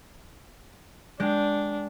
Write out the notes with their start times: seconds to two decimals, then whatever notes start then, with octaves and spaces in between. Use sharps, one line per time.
1.20 G#3 D4 G5